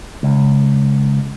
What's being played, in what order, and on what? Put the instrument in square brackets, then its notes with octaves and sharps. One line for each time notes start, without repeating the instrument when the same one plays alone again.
[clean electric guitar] C#2